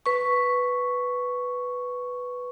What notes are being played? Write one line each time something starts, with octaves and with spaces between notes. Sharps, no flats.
B4 C#6